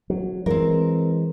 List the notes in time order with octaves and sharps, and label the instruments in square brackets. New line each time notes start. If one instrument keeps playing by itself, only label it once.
[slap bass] F#3
[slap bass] E3 G#3 [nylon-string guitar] C4 A#4